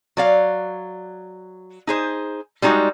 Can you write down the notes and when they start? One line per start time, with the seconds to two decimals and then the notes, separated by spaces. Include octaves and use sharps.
0.17 F#3 D5 F5
1.87 D#4 G#4 C5
2.62 G3 G#3 D#4 F#4